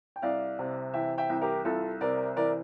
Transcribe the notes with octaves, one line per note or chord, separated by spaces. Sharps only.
G5
C2 D5 F5
C3
E3 E5 G5
E5 G5
C2
G4 A#4
C2 F4 A4
C3 A#4 D5
E3 A#4 D5